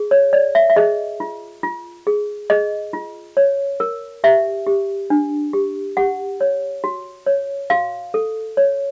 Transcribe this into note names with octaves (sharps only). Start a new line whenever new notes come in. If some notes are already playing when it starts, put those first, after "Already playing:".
Already playing: G#4
C#5
C#5 D5
E5
E5
G#4 D#5
F4
F4
G#4
G#4 D#5
F4
C#5
A#4
G4 E5
G4
D4
G4
G4 F#5
C#5
F#4
C#5
F#4 F5
A4
C#5